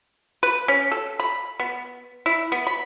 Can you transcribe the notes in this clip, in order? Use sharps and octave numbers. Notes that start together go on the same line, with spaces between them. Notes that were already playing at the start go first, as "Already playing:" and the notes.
B4
C#4
A4
B5
B3
E4
B3
B5